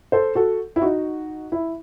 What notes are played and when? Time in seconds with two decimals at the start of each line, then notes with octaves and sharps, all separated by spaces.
0.12 A4 C5
0.35 F#4 A4
0.76 E4
0.82 D#4 F#4
1.52 E4